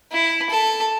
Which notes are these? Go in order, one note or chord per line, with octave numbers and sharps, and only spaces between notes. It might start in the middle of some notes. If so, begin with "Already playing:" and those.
E4
A4